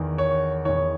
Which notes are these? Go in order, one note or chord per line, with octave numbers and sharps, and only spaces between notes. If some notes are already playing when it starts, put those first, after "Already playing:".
Already playing: E2 D#3
C#5
E2 D#3 C#5